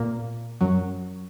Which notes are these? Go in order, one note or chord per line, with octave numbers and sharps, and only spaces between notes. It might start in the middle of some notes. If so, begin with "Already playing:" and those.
Already playing: A#2 A#3
F#2 F#3